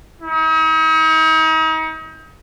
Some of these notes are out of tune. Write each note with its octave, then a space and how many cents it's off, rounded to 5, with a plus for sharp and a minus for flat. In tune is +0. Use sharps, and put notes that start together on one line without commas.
D#4 +40